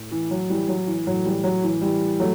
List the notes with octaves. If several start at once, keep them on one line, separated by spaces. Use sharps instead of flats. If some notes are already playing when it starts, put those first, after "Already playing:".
Already playing: A2
E3
F#3
E3 G3
F#3
E3
A2 E3 F#3
E3 G3
F#3
E3
E3 G3
F#3 A3